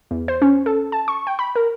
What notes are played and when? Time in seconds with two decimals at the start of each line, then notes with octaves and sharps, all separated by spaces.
0.11 E2
0.28 C5
0.42 C#4
0.66 A4
0.92 A5
1.08 C#6
1.27 G5
1.39 B5
1.55 A#4